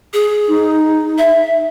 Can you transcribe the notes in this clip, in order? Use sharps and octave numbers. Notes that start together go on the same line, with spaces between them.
G#4
D#4
E5